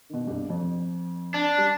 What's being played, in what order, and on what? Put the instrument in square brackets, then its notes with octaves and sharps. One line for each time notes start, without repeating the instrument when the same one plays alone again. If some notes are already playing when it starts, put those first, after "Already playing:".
[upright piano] B2 D#3
C2 G2
F2
[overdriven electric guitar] D4
[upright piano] G3